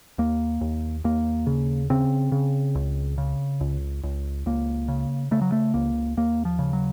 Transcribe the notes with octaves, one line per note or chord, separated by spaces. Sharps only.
D#2 A#3
D#2
D#2 A#3
C#3
C#3 C4
C#3
C#2
C#3
C#2
C#2
C#2 A#3
C#3
C#3 A3
F#3
A3
C#2 A#3
D#2 A#3
F3
C#3
F#3